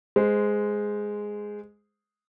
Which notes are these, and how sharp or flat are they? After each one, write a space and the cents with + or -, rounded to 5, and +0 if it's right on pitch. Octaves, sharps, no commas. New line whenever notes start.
G#3 +0 C5 -20